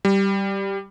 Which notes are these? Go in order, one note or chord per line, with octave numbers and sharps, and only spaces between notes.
G3